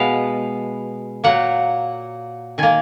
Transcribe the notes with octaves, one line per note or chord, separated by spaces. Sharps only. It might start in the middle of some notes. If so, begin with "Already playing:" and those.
Already playing: B2 G#3 B3 F5
A#2 F#3 A#3 F#5
D#3 A#3 G#5